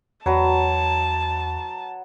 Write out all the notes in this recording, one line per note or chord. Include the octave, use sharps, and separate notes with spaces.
E2 F#3 B4 A5 A#5